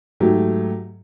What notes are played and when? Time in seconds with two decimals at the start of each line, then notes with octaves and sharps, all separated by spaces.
0.20 G#2 F#3 A3 G4